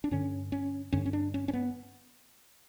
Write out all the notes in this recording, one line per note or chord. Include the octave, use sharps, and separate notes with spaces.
D4
G2 D3 C#4
C#4
G2 D3 C#4
C#4
D4
C#4
C#4
B3